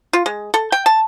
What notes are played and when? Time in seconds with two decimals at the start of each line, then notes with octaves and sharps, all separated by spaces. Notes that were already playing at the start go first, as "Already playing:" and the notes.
0.13 F4
0.26 G#3
0.54 A4
0.72 G5
0.86 A5